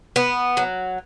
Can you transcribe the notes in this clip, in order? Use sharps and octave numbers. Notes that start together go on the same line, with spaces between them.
B3
F#3